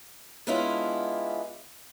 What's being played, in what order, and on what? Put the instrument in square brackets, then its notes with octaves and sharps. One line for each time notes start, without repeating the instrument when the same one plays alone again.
[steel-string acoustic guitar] G#3 B3 C#4 D4 E4 F4